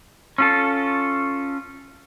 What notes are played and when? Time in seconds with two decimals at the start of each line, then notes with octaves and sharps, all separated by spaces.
0.38 C#4 F4 A4